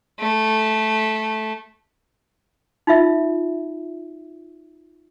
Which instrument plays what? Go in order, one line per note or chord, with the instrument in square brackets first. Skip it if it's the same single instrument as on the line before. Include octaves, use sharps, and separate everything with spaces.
[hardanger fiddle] A3
[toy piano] D#4 F4 E5